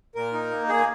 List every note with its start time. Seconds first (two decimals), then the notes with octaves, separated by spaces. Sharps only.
0.15 A#2 A#4
0.33 D#4
0.51 A#3
0.69 A#2 G#4